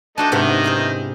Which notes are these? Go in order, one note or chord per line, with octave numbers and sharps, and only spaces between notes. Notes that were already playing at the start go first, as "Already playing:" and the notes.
A3 D4 D#4 F#4 C5 A5
G#2 C3 D#3 B3 D#4
E4 G#4 C5